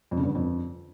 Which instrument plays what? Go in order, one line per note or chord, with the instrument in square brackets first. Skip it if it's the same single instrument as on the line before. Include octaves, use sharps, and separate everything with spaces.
[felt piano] F2
C#3
G2
D3
F2